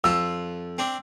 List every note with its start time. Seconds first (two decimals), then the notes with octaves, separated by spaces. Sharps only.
0.04 F2 F4 E6
0.78 C4 D4